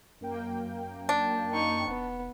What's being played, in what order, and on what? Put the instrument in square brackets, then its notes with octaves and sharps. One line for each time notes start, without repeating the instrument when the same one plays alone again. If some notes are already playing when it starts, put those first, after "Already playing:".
[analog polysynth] F#2 A#3 G5
[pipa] D4
[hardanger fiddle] D#4 C#6
[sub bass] E1 [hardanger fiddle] B3